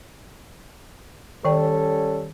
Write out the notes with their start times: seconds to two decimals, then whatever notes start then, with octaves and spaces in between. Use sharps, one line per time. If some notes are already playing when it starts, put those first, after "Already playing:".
1.45 D#3 G3 C#4 A4 D5 G5